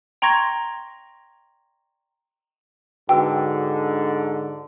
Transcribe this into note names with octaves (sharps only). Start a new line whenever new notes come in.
G5 A#5 C6 C#6 G#6 A#6
G#2 D3 F#4 B4 G5 E6